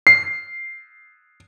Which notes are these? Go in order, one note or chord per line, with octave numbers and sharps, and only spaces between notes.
C7